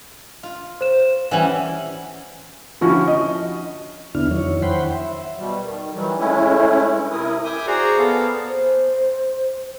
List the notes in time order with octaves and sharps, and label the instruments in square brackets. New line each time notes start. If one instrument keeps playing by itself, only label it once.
[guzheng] F4
[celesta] C5 E7
[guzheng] E3 G3 C#4 [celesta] F#5 F#7
[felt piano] D3 F3 C#4 E4 F#4
D#5
[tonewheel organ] E2 D3 B3 D4 E4 F6
F2 D#3 F#3 E4 C#5
C5 F#5 G5 B5 C6
E5
[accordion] B2 G3
D#3
D#3 E3 F#3 G3
G#3 A3 C#4 E4
G2
C3 E4 A#4 D#6
[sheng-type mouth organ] E5 G5 G#5 D6 D#6
F#4 G#4 C5 D5 F#5 A#5
B3 A4 F5
[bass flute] C5